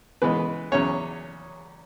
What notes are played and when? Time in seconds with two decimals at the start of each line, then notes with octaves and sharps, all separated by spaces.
0.22 C#3 E3 G#3 B3 B4
0.72 E2 C#3 F#3 C#4 C#5